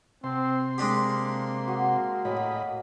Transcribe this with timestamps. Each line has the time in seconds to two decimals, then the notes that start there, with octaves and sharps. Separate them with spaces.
0.24 C3 C4 A5 C6
0.78 G#3 A#3 D4 G4
1.68 F#4 D#6
2.25 A2 F#3 D#5 G5 G#5 B5